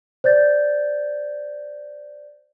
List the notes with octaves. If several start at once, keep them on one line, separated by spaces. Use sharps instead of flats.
C5 D5 G6 A6